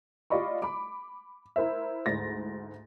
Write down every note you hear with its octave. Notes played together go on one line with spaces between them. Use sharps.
F4 G4 D5 D#5 B5 C#6
B5 D6
E4 A#4 C5 E5
D2 G#2 E4 A6 A#6